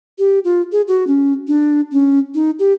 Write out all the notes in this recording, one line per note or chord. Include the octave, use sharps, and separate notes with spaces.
G4
F4
G#4
F#4
C#4
D4
C#4
D#4
G4